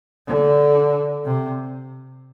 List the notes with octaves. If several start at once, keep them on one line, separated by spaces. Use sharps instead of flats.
D3
C3